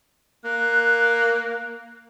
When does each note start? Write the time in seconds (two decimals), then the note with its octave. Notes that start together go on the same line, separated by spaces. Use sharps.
0.45 A#3 F#6